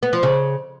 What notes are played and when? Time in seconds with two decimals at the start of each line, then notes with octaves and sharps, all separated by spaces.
0.03 B3
0.13 F3
0.23 C#3